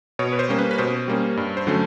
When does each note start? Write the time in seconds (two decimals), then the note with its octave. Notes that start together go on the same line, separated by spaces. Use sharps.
0.19 B2 C#5
0.33 B4
0.39 C5
0.49 G3 A#3 C#4
0.59 B4
0.71 B4
0.78 B2 C5
1.08 G3 A#3 C#4
1.37 G2
1.57 C5
1.67 D3 F#3 A3 C#4